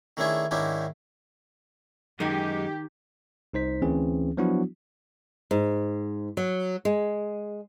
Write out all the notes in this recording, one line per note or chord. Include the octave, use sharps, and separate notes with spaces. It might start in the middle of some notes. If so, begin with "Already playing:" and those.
D#3 A3 C#4 D4 E4 G#4
G#2 D#3 C#4 D4 E4 G4
F#2 D#3 G#3 D#4 G4 G#5
C2 D#4 C5 B6
D2 E3 C4 C#4 G#4
F3 F#3 B3 D4 E4 F#4
G#2
F#3
G#3